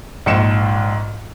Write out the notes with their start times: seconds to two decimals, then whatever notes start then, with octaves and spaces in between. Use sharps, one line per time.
0.26 A#1 G#2 C#7 E7